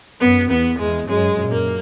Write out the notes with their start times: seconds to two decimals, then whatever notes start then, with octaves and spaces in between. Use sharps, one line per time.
0.20 F#2 B3
0.50 E2 B3
0.78 E2 G#3
1.08 F#2 G#3
1.36 F#2 A#2
1.51 A#3